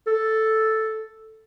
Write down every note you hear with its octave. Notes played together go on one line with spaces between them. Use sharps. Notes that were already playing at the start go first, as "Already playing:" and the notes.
A4